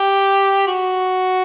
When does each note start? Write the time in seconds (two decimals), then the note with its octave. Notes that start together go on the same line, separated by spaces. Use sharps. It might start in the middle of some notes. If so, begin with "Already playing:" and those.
Already playing: G4
0.67 F#4